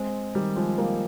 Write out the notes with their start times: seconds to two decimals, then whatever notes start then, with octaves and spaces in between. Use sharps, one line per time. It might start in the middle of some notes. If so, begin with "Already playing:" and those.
Already playing: G#3 C4
0.35 D#3 G3
0.56 F3 G#3
0.78 G3 A#3